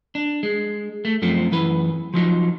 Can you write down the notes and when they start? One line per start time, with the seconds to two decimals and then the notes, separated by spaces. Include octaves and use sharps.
0.15 D4
0.43 G#3
1.05 A3
1.22 F#2 F3 A3 C4
1.51 F#2 E3 B4
2.14 F3 F#3 D#4